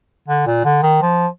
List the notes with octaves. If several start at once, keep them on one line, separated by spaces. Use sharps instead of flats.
D3
A#2
D3
D#3
F3